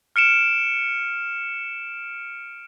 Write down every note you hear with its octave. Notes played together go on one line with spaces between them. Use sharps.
F6 C#7 D7 E7